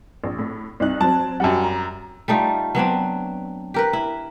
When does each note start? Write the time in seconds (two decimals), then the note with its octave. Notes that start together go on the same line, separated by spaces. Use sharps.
0.24 A#1
0.39 A2
0.80 C2 D#4 F#6
1.01 F#3 C4 A5
1.40 F#2 G3 F#5 G5 A5
1.64 A#5
2.28 G3 A3 D#4 F4
2.75 F#3 B3 C4 D4
3.74 G4 A#4 B4
3.93 E4